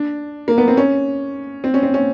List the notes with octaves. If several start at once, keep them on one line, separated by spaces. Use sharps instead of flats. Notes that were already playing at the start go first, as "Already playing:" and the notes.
Already playing: D4
A#3
B3
C4
C#4
C4
C#4
C4
C#4